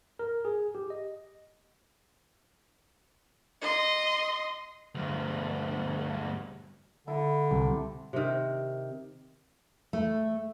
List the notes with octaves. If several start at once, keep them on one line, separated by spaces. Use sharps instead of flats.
A#4
G#4
G4
D#5
D#5 C6
D2 G2
D3 E4 A4
C2 C4 D6
C3 D#3
A3